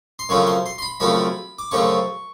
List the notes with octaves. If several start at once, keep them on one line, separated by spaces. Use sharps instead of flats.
C6
F#2 C#3 F3 A3 C4 C#6
C6
C6
C6
B5
F#2 C#3 F3 A3 C4 B5
D6
F#2 C#3 F3 A3 C4 C#6